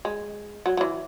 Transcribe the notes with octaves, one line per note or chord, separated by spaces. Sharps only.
G#3
F#3
F#3
E3